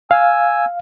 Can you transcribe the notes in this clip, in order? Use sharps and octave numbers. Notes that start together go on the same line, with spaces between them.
F5 G#5 E6